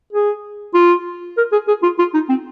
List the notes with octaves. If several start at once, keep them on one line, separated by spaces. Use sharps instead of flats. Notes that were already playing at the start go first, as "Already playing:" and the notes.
G#4
F4
A#4
G#4
G#4
F4
F4
D#4
C4